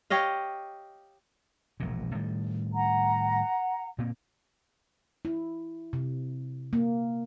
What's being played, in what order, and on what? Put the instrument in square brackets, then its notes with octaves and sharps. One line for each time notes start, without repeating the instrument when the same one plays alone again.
[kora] G4 C#5 D#5 F5
[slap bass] E1 A#1 A#2
A2 D#3 G3
[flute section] F#5 A#5
[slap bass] A#2 A#3 C4
[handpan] E4
C3
A#3